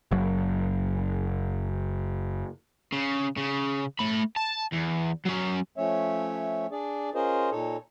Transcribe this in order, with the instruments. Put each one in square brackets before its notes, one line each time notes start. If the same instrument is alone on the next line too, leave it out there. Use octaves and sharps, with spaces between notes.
[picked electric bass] F#1 F#3
[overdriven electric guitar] C#3
C#3
A3 B5
A5
E2
F#3 C#4
[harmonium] F3 A3 C#4 C#5 E5
D4 G#4 D5
C#4 F4 G#4 A#4 C5 D#5
A#2 D#4 A4 C#5